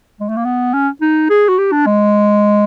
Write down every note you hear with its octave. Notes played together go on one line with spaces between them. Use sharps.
G#3
A3
A#3
B3
C#4
D#4
G#4
F#4
G4
D4
G#3